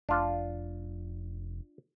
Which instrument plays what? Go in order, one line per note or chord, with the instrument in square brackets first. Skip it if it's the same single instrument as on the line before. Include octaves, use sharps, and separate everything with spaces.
[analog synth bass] F1 [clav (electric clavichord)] D4 F4